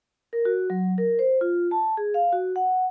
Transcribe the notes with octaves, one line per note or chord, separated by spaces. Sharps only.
A#4
F#4
F#3
A#4
C5
F4
A5
G#4
F5
F#4
F#5